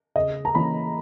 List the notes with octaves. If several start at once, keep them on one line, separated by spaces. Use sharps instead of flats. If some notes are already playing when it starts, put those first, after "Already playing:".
C#3 D#5
A#5
E3 A#3 C#4 B5